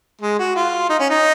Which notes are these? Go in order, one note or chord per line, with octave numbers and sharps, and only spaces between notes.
G#3
F#4
F4
D#4
C#4
D#4